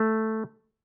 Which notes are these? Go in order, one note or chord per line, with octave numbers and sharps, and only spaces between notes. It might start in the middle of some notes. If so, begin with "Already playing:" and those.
Already playing: A3